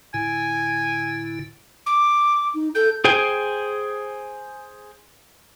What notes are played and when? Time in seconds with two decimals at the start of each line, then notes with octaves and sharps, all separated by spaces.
0.14 A2 D3 E4 G#5
1.86 D6
2.54 D#4
2.75 A4 G6
3.05 G#4 C5 G5 G#5